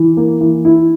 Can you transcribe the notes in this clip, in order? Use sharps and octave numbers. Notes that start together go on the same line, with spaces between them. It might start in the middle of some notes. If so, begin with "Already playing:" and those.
Already playing: E3
A#3
E3
E4